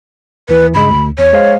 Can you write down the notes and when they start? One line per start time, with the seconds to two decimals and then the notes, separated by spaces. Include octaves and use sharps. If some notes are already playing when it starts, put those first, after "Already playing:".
0.49 D#2 E3 B4
0.74 G2 C#3 G#3 B5
0.90 D2
1.19 E2 C#5
1.33 G#3 C5 F5